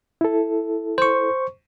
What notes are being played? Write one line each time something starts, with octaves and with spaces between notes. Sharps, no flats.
E4 A4
C5 C#6